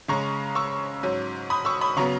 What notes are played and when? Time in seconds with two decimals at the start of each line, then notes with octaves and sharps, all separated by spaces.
0.08 C#3 G#3 C#4 A#5 C#6
0.55 C#6 E6
1.03 G#2 F#3 C#4
1.50 B5 D#6
1.65 C#6 E6
1.81 B5 D#6
1.97 C#3 F#3 B3 A#5 C#6